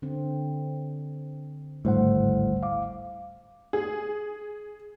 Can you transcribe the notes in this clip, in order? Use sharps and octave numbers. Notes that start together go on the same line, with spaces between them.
D3 C4
G#1 D2 A2 G3 C5 F#5
F5 D6
G#4